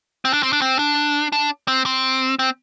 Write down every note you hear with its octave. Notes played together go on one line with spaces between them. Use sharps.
C4
D4
C4
D4
C4
D4
D4
C4
C4
C4